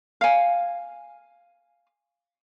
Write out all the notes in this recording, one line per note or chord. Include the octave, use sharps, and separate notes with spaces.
F5 G#5